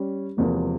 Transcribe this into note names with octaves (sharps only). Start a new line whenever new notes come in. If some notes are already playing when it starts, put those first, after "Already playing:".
Already playing: G3 C#4
E1 E2 C3 F3 A#3